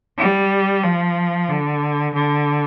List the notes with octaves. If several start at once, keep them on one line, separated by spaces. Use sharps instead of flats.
G3
F3
D3
D3